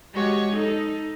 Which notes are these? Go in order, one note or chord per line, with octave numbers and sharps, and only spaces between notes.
G#3 F#4 G4 C#5 D#5
D#4 A4